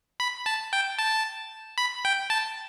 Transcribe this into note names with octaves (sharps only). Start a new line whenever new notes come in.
B5
A5
G5
A5
B5
G5
A5